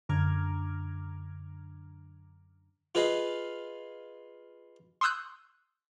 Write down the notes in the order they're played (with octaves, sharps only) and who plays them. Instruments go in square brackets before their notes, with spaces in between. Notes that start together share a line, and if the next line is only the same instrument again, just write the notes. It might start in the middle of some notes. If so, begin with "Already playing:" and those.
[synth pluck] F#2 D3 A#5 D6 F6 G#6
[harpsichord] F4 G#4 B4 D#5 F5
[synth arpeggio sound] C6 C#6 D#6 E6 F#6 G6